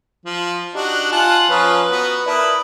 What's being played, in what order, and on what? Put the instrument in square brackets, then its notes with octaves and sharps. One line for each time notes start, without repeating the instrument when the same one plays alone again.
[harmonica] F3
[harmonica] D4 D#4 F#4 [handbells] G4
[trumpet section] F4 [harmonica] F#5 A5 [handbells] G#5
[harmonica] F3 C#4 F5 [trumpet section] B4 [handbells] A#5 D#6 F#6
[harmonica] B3 F#4
[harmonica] E4 A#4 B4 [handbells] D5 A5 D#6